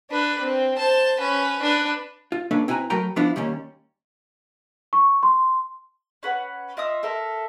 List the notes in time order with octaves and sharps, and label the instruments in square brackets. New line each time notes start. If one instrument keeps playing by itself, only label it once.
[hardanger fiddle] D4 B4
C4
C5 A5
C#4 B4
D4 B4
[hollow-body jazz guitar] F4
A#3 C#4 D4 A4 B4
C4 E4 B4 G#5 A#5
F#3 A3 A#4 B4 G5 A#5
F3 B3 D4 E4 F4
D#2 G3 A#3 C#4
[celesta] C#6
C6
[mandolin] C#4 B4 F#5
F4 D#5 E5 D#6
A4 A#4 E5